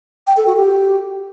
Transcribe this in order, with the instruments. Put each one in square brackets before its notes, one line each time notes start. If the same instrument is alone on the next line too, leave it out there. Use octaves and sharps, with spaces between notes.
[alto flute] G5
A4
F#4
G4